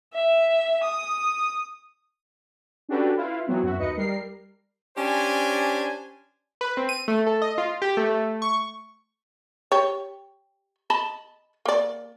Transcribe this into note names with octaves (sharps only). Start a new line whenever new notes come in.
E5
D#6
C#4 D4 F#4 G4 A4 B4
E4 F4 B4 F5
E3 F#3 B3 C4
F#2 F#4 E5
D#2 D#4 B4 D#5 C#7
G3 A#4 C7
C#4 D4 G4 C5 G#5
B4
C4
D#7
A3
A4
D#5
F4
G4
A3
A3
C#6
G4 C#5
D#5 A5 B5
A#3 D5